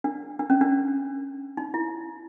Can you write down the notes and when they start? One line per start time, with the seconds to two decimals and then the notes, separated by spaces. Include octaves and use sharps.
0.04 D4
0.39 D4
0.50 C#4
0.61 D4
1.57 D#4
1.74 E4